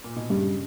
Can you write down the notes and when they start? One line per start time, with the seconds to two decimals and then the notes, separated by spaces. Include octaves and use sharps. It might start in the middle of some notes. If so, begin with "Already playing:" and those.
0.04 A#2
0.16 B2
0.30 G2 C#3